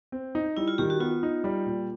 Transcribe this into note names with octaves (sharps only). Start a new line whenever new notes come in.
C4
D#4
G3 E4
F4
D#3 G4
F#4
B3 F4
D#4
G3
A#2